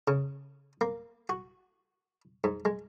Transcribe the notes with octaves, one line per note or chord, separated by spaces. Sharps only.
C#3
A#3
F#4
G#2
G#3